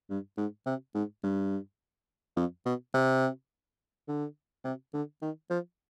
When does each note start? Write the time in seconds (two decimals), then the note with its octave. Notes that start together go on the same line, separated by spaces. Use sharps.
0.10 G2
0.37 G#2
0.66 C3
0.95 G#2
1.23 G2
2.37 F2
2.66 B2
2.94 C3
4.08 D3
4.64 C3
4.94 D3
5.22 D#3
5.50 F3